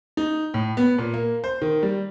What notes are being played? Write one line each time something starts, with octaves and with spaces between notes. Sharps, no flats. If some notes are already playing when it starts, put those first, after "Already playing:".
D#4
A2
B3
A#2
A#3
C5
D#3
G3